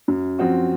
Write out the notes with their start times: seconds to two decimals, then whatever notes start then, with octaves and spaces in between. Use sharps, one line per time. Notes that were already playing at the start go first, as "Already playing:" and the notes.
0.08 F#2
0.39 F3 C4 F#4